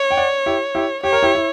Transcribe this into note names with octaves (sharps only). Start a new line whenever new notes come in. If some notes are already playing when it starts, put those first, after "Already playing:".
Already playing: C#5
G5
D5 F#5
E4 G4
E4 G4
G4 C#5
A#4
E4 G4
E4